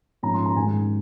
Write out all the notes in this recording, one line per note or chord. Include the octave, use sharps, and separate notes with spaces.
G#2 F3 A#3 C#4 A#5
C6
A#5
G#2 D#3 G#3 C#4 G#5